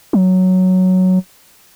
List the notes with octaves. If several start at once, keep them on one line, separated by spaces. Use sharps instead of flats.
F#3